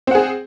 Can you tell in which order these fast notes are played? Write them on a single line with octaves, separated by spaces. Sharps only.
C4 F#5 G#4